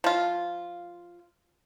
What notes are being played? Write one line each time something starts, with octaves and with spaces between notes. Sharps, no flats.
F3 F4